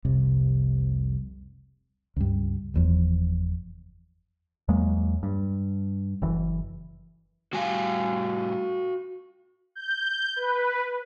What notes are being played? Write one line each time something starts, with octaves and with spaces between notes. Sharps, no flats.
F1 C2 C3
C#2 G2
F#1 E2 F3
E2 F#3 G#3 A#3
G2
F#1 E3
A2 G3 F#4 F5 G#5
G6
B4